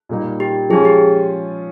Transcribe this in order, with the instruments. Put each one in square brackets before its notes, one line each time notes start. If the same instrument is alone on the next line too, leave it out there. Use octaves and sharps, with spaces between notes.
[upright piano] A#2 G3 A#3 D#4
[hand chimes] G4
[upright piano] F3 G#3 C#4 F4 [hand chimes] G#4
[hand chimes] G4